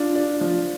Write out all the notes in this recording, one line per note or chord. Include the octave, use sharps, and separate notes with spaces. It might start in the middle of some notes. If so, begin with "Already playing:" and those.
Already playing: D4 F4
D4
F3